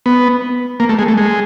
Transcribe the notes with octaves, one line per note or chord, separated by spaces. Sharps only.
B3
A#3
A3
G#3
A3
G#3